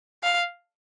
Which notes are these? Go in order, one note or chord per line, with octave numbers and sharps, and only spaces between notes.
F5